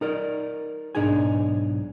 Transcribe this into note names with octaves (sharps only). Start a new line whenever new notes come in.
D#4 A#4 D5
B1 G#2 D4 D#4 G#4 G#5